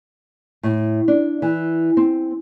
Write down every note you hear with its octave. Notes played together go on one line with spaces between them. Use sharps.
A2
D4
E3
C4